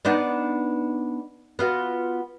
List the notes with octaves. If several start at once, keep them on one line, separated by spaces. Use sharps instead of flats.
B3 D4 D#4
B3 F4 F#4